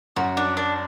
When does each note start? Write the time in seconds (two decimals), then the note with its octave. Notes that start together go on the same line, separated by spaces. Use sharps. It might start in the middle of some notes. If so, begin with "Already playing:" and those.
0.16 F#2 F#4
0.37 D4
0.57 D4